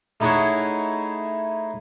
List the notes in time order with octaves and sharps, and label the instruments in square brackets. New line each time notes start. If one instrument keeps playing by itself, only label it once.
[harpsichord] A3 D#4 E4 G#4 C#5 F#5